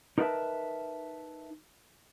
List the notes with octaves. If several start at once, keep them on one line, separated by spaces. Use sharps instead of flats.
D#4 A#4 B4 D5 E5 A5